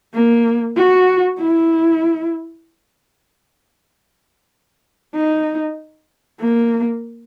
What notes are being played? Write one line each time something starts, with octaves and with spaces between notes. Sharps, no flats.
A#3
F#4
E4
D#4
A#3